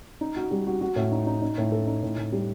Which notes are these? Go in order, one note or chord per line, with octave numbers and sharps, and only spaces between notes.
D#4
F#4
G3
F#4
F#4
A2
D#4
D#4
D#4
A2
A4
D#4
A2
A2
G3